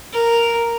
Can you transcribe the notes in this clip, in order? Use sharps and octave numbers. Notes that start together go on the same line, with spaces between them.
A#4